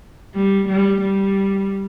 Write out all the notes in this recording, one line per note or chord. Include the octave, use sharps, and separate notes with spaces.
G3
G3
G3